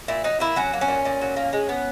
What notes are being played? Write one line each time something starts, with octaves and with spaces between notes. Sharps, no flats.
A#2 E4
F#3 D#4
A#3 E4
F#3 C#4
A#3
C#4
A#2
A#2
F#3
A#3
G#3
B3